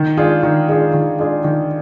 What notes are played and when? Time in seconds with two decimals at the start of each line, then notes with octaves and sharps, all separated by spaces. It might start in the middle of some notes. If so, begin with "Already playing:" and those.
Already playing: D#3
0.17 G#3 D4 F4 G#4
0.43 D#3
0.68 G#3 D4 F4 G#4
0.94 D#3
1.19 G#3 D4 F4 G#4
1.44 D#3